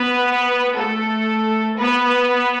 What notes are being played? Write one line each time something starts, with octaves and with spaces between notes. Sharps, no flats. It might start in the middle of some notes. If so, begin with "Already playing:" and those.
Already playing: B3 B4
A3 A4
B3 B4